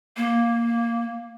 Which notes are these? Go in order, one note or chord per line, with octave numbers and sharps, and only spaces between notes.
A#3